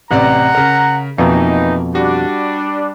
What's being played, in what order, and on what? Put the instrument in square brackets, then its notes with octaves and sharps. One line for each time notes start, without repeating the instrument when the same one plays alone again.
[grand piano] A1 C3 D5 [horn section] F#5 A#5
[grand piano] C#3 A#4
[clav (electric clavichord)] F2 B2 [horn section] E3 D#4 [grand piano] A#3
[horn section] G3 D4 [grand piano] F#4